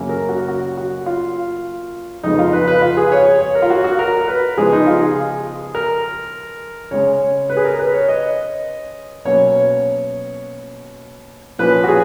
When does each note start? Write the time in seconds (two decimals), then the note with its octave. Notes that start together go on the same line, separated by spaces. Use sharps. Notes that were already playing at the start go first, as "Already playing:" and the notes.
Already playing: F#2 C#3 F#3 A#3 C#4
0.09 A#4
0.29 F#4
0.48 F#4
0.77 F#4
1.06 F4
2.23 F2 C#3 G#3 B3 D#4
2.39 F4
2.53 B4
2.68 B4
2.82 F4
2.97 G#4
3.12 C#5
3.26 C#5
3.41 C#5
3.55 A#4
3.62 F4
3.70 F#4
3.84 F#4
3.99 A#4
4.28 B4
4.57 C#3 F3 G#3 B3 G#4
4.73 D#4
4.87 F4
5.02 G#4
5.75 A#4
6.91 C#3 G#3 C#4 C#5
7.50 B4
7.57 G#4
7.64 A#4
7.79 B4
7.94 C#5
8.08 D#5
9.25 B2 F#3 A#3 C#4 C#5
11.59 A#2 F3 A#3 C#4 B4
11.84 F#4
11.88 G#4